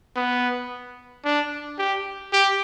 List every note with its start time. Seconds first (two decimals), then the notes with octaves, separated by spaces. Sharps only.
0.16 B3
1.25 D4
1.79 G4
2.33 G4